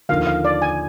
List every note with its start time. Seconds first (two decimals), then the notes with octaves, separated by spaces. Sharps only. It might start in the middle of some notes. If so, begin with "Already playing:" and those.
0.09 D#2 D3 F3 F5
0.27 F5
0.45 D5
0.62 G#5